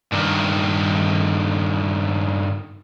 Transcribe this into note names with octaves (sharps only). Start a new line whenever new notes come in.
G2 D#3